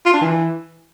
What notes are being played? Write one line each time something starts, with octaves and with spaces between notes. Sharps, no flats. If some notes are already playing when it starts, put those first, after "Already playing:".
F4
D4
E3